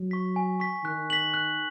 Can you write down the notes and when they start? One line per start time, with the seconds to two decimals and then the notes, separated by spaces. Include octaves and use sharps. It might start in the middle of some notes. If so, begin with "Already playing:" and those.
Already playing: F#3
0.11 C#6 B6
0.36 G#5
0.60 C#6 B6
0.84 D#3 F#6
1.10 B6 F#7
1.34 F#6